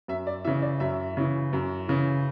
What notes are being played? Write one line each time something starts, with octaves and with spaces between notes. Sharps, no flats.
F#2 E5
D5
C#3 E3 E5
D5
F#2 E5
C#3 E3
F#2
C#3 E3